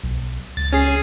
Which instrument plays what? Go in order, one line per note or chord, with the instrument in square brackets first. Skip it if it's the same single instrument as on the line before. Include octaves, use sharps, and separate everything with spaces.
[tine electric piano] B1
[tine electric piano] C#2 [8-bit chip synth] A6
[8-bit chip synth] C#4 G#4 C7